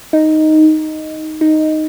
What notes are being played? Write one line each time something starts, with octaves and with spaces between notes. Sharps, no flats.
D#4
D#4